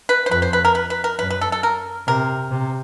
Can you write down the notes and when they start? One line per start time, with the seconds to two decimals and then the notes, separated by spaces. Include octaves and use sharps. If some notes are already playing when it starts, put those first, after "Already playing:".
0.09 B4
0.26 C5
0.31 F2 B4
0.42 C5
0.53 B4
0.65 A#4
0.75 B4
0.90 B4
1.04 A#4
1.19 F#2 B4
1.30 B4
1.41 A4
1.52 A4
1.63 A#4
2.08 C3 A#4
2.51 C3